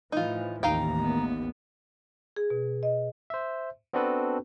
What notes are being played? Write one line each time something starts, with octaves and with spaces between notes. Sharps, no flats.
A2 E3 F3 D#4 F4
A1 D#2 D#4 F5 G5 A#5
B3
G#4
B2
D#5
C5 E5
B3 C4 D4 F#4 A4 B4